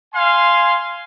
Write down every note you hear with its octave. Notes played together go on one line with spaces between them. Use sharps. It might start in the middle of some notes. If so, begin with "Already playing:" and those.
F5 G#5 C6